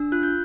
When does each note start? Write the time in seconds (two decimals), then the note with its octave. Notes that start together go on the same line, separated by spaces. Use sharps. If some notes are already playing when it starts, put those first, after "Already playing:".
Already playing: D4 E6
0.12 F4 F#6
0.23 G6